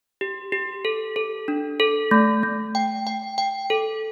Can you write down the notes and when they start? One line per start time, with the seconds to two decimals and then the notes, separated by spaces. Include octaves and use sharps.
0.21 G4
0.52 G4
0.85 A4
1.16 A4
1.48 D4
1.80 A4
2.11 A3
2.43 A3
2.75 G5
3.07 G5
3.38 G5
3.70 A4